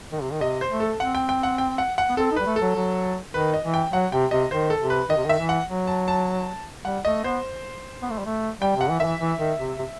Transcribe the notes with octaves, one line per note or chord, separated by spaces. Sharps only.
D#3
C3
D#3
C3 D#5
C5
A3
A4
C4 F#5
G5
G5
F#5
G5
F#5
F#5
B3
C4 A4
D#4
G3 B4
A3
A4
F#3
F#3
D#3 B4
D#5
E3
G5
F#3 F#5
C3 G5
C3 D#5
D#3 C5
A4
C3
B4
D#3 D#5
C3
D#3 E5
E3
F#5
F#3
A5
A5
G3 F#5
A3 D#5
B3 C5
B3
A3
G3
A3
G3 G5
C3 F#5
E3
D#3 E3 E5
E3
D#3
C3
C3